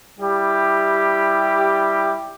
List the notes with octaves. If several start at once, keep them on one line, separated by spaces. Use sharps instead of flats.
G3 E4 G4